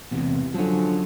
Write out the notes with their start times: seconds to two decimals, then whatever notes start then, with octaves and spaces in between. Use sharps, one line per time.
0.11 E2 C3 E3
0.54 D3 F3 F#3 C#4